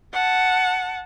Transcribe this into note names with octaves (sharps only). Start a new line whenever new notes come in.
F#5 A5